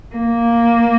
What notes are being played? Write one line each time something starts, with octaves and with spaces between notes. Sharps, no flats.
A#3